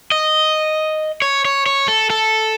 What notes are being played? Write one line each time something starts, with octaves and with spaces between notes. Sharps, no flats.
D#5
C#5
C#5
C#5
A4
A4